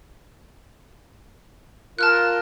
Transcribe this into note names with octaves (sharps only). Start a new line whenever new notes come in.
F4 A#4 A5 F6 F#6